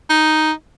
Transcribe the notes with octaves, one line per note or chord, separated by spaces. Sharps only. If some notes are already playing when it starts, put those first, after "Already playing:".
D#4